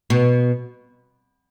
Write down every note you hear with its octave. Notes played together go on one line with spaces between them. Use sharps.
B2